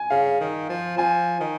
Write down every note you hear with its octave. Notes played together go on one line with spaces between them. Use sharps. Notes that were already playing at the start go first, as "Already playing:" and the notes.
Already playing: G#5
C#3 F5
D#3
F3
F3 G#5
D#3